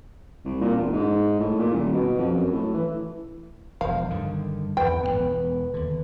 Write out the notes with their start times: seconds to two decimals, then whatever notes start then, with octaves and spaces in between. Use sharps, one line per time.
0.45 C2
0.61 A#2
0.76 E1
0.93 G#2
1.40 A2
1.59 A#2
1.73 D#1
1.93 B2
2.18 F2
2.36 F#2
2.53 A2
2.74 E3
3.81 E1 F3 F5
4.10 G2 D3 D#3
4.77 E2 B4 G5
5.03 E1 F2 B3
5.74 D#2 D3